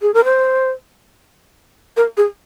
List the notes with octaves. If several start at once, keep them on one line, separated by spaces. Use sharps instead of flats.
G#4
A#4
C5
A#4
G#4